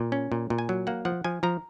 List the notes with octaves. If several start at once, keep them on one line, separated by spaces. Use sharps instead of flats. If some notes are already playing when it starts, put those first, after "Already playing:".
Already playing: A#2
C#4
A#2
A#2
G#5
F#3
A#3 F#5
F3 F#5
F3 G#5
F3 A#5